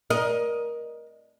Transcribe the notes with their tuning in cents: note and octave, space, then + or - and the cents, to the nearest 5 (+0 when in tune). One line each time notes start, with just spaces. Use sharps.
A#4 +20 D#5 +0